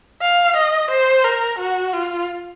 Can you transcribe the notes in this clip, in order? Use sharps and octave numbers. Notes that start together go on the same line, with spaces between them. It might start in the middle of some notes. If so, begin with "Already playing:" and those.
F5
D#5
C5
A#4
F#4
F4